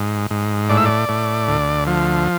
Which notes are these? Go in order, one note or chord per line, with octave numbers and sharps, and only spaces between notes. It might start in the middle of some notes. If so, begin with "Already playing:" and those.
Already playing: G#2
G#2
A2 D5
E5
D5
A2
D2
F3